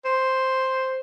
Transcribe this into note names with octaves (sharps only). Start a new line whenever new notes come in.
C5